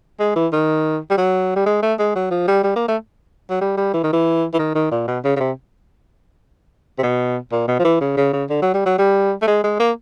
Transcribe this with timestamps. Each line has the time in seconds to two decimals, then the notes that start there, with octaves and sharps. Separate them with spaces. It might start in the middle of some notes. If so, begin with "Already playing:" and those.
0.20 G#3
0.36 E3
0.53 D#3
1.10 G3
1.17 F#3
1.56 G3
1.66 G#3
1.82 A3
1.99 G#3
2.15 F#3
2.31 F3
2.48 G3
2.64 G3
2.76 A#3
2.88 A3
3.50 F#3
3.61 G3
3.77 G3
3.94 E3
4.03 D#3
4.13 E3
4.54 E3
4.59 D#3
4.75 D#3
4.91 A#2
5.08 B2
5.24 C#3
5.36 C#3
5.40 C3
6.98 C3
7.03 B2
7.52 A#2
7.68 B2
7.79 F3
7.85 E3
8.01 C#3
8.17 C#3
8.33 C#3
8.50 D3
8.62 F#3
8.74 G3
8.86 F#3
8.99 G3
9.42 A3
9.47 G#3
9.64 G#3
9.80 A#3